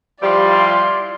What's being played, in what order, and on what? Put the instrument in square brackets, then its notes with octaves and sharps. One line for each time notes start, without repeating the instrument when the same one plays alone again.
[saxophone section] F3 G3 [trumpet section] E4 F4 C6 [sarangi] D5